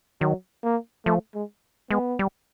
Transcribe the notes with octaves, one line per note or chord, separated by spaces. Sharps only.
D#3 F#3
A#3
F3 A3
G#3
G#3 B3
G3